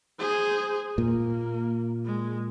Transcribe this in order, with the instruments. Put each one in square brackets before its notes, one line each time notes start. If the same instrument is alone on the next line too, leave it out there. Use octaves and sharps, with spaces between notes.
[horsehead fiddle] G#4 C5
[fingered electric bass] A#2 [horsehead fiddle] A#3
[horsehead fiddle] G#3